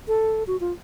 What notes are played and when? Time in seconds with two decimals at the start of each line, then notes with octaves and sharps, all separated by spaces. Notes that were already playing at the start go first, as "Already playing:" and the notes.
0.08 A4
0.47 F#4
0.60 F4